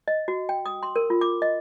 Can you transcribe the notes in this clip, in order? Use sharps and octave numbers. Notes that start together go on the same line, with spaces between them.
D#5
F#4
G5
D#6
C6
A#4
F4
D6
D#5